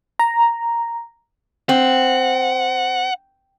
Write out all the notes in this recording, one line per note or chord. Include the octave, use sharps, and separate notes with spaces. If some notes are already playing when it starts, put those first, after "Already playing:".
A#5
C4 F#5